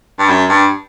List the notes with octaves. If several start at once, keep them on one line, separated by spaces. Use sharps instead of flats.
G2
F#2
G2